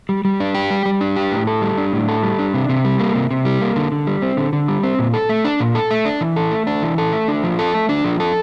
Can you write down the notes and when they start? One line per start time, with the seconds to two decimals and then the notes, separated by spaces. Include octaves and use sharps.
0.09 G3
0.25 G3
0.40 D4
0.55 G4
0.70 G3
0.86 G3
1.01 D4
1.16 G4
1.32 A2
1.47 A4
1.62 G3
1.78 D4
1.93 A2
2.09 A4
2.23 G3
2.39 D4
2.54 C3
2.69 C3
2.85 G3
2.99 A#3
3.15 C3
3.31 C3
3.45 G3
3.61 A#3
3.76 D3
3.92 D3
4.07 G3
4.22 C4
4.37 D3
4.53 D3
4.68 G3
4.83 C4
4.99 A#2
5.14 A4
5.29 A3
5.45 D4
5.60 A#2
5.75 A4
5.91 A3
6.05 D4
6.21 E3
6.36 A4
6.52 A3
6.67 D4
6.83 E3
6.98 A4
7.13 A3
7.28 D4
7.44 F3
7.59 A4
7.74 A3
7.89 D4
8.04 F3
8.20 A4